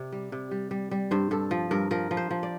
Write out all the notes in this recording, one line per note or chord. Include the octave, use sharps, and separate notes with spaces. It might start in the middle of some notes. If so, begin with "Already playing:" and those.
Already playing: C3 D5
G3
C3
G3
G3
G3
G2 C5
G2 A4
F3
G2 A#4
F3 A#4
F3
C5
F3
D5